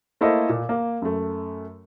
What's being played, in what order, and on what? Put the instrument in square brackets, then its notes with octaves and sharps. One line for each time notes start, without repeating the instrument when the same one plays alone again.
[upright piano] A3 A#3 E4 A4 C5 D#5
A#2
A#3
F#2 A3